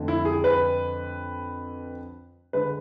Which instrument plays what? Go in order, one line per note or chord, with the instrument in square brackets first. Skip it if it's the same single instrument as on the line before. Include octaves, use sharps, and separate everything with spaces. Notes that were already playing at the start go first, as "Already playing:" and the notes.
Already playing: [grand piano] F2 D3 A3
E4
G#4
B4
D3 G#3 B4